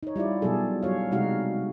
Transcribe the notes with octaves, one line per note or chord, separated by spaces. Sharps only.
D#4 C#5
G3 E4 F4 D5
B2 F#3 G3 G#4 A4
F#3 G3 C#5 F5
C3 G3 G#3 D#4 F#4 F5